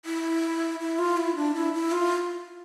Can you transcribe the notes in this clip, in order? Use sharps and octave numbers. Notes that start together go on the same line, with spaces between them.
E4
E4
F4
E4
D4
E4
E4
F4